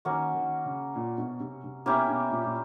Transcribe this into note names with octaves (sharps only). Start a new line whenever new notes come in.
D#3 A#3 C#4 F#4
D#3
C#3
A#2
B2
C3
C3
B2 A#3 C#4 E4 G4
B2
A#2
A#2